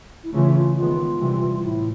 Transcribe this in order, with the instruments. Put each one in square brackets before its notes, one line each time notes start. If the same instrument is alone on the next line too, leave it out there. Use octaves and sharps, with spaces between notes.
[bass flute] E4
[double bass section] C#3 E3 A3 C#4 [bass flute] F4
[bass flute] F4
[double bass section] D#3 G#3 B3 [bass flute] F4
[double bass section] C3 E3 G3
[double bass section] A2 [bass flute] E4